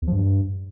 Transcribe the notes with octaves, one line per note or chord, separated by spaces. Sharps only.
E2
F3
G2